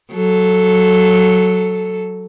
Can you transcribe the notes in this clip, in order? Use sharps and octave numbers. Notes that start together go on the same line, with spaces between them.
F#3 A4